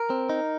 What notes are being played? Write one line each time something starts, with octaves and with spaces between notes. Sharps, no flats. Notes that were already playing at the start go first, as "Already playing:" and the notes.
Already playing: A#4
C4
D#4